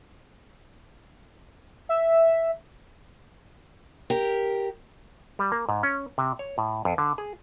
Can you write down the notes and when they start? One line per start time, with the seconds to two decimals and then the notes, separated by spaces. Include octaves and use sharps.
1.89 E5
4.10 G4 A#4
5.39 G3
5.52 A#3
5.69 G#2
5.83 C#4
6.18 C3
6.39 C#5
6.58 A2
6.85 F2
6.98 D3
7.18 G#4